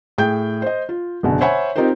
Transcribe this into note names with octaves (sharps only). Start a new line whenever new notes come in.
A2 G#4 G5 G6
C5 D#5
F4
F#1 B2 D3
C5 C#5 E5 F#5 G#5 B5
C4 D#4 F4 G4 A#4 C5